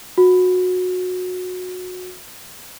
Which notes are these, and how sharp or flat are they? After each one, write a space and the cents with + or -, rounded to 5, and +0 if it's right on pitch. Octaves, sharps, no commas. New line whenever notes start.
F#4 -20